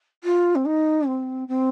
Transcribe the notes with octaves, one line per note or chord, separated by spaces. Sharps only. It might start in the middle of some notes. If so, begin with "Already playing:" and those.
F4
C4
D#4
C4
C4